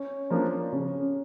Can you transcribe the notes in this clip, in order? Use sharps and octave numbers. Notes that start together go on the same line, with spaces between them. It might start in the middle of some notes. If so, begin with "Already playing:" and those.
Already playing: C#4
F3 A#3 D4
C#3 C#4